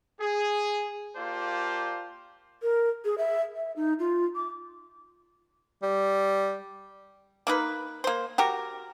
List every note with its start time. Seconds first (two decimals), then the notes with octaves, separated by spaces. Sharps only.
0.21 G#4
1.16 A#3 F4 G4 C5 D5 A5
2.62 A#4
3.05 G#4
3.18 E5
3.56 E5
3.76 D#4
3.99 F4
4.36 D6
5.82 G3
7.47 A#3 D#4 B4
8.04 A#3 C5
8.38 F#4 G4 A#4